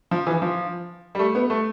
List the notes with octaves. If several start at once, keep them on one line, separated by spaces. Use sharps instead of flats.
F3
E3
F3
G3
A3
B3
A3